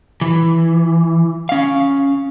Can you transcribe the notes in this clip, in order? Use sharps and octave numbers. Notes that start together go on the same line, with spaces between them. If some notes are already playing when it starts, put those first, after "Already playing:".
E3
C#4 F5